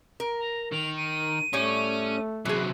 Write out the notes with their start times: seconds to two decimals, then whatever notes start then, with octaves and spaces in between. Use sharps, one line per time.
0.20 A#4
0.39 A#5
0.72 D#3 F7
0.97 D#7
1.53 A2 G3 A3 C#4 C#5
2.45 C3 E3 F#3 G#4